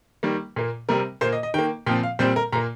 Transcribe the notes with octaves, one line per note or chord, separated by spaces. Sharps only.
D#3 G3 A#3
A#2 A#3
C3 G3 C4 A#4
A#2 A#3 C5
D#5
D#5
D#3 A#3 G5
A#2 F3 C4 G5
F5
A#2 G3 C4 C5
A#4
A#2 A#3 A#5